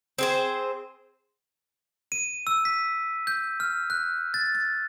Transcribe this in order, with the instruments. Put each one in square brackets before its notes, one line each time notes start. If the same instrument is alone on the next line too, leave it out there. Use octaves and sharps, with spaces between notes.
[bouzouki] C4 G#4 C5
[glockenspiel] D#7
E6
B6
G6
F6
F#6
A6
A6